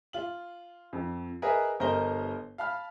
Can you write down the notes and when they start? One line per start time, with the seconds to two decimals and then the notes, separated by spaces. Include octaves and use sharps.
0.13 F4 F#7
0.93 F2
1.42 G#4 A#4 B4 D#5 E5
1.80 G1 A#4 C5 D#5 A#5 G7
2.58 F5 A5 B5 F6